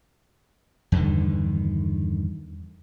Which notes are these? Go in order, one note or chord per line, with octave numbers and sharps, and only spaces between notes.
E2 G2 D3 D#3